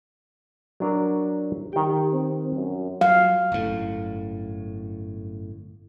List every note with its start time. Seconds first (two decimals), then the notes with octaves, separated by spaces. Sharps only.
0.80 F#3 D4 A#4
1.73 D#3 G4 G5
2.13 C4
2.55 F#2
3.01 F#3 F5
3.52 G1 F#2 A2